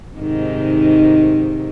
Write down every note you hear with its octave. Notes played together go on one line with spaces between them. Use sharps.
G#2 C3 D#3